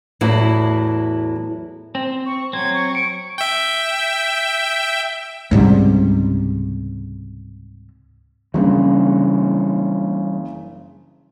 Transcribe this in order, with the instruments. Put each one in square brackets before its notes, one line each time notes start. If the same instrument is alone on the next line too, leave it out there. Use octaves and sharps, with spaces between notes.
[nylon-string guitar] E2 A2 F#3 E4 F5
[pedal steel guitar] C4
[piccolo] C#6
[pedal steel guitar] F#3 C4 [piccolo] G#6
[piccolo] C#6
[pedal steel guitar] C#6 [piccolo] D7
[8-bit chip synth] E5 G5
[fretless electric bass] C#2 G#2 C3 G3
[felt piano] F#1 C#3 [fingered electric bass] E3 G3 D4